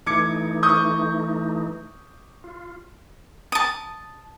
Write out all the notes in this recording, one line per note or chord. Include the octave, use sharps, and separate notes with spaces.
E3 A3 D#4 D6 G#6 C#7
C#6 D#6 G6
F4
A5 D#6